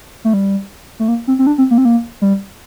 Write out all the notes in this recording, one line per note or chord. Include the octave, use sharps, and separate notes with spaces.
A3
G3
A3
A#3
C4
C4
D4
C4
A#3
C4
A#3
G3